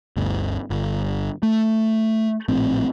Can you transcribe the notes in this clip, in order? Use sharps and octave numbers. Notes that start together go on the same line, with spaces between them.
G1 D2
G1
A3
A#1 A2 C4